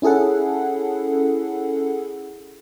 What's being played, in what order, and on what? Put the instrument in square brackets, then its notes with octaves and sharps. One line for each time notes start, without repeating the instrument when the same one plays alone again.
[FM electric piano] C#4 E4 G#4 A4 F#5